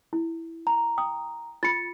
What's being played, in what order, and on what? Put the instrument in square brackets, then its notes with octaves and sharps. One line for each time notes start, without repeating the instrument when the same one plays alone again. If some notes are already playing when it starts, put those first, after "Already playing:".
[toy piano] E4
[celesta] A#5
[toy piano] G5 D#6
[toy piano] F4 B5 [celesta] A6 C#7